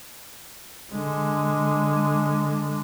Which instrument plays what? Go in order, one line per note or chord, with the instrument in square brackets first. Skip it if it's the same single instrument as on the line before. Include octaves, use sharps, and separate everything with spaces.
[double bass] D3 G#3